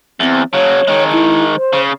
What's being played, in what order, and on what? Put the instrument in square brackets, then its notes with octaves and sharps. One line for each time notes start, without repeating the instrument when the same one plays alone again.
[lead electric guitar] E2 [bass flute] C4
[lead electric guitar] C#3 F#3 [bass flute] C#5
[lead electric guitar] D#3 G#3
[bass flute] E4
C5
[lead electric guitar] C#3